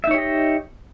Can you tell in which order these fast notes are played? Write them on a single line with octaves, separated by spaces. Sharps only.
E5 D#4 C#5 G4 D#5